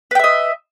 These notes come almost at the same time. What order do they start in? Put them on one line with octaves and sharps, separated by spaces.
B4 G5 E5 D#5